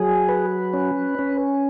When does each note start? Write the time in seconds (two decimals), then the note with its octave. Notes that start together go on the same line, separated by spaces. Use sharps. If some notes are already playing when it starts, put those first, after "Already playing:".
Already playing: F#3 G#4
0.29 B4
0.73 C#4
1.19 C#4